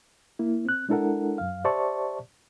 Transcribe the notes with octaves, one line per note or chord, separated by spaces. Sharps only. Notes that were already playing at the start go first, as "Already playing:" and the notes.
A#3 E4
C4 F#6
G#3 D4 E4 A4 A#4 F#5
F#2 F5
G4 C5 D5 E5 A5 C#6